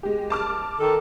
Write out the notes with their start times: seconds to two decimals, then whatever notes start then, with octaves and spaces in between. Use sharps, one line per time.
0.03 G#3 G4
0.30 A5 D6 F6
0.80 D#3 A4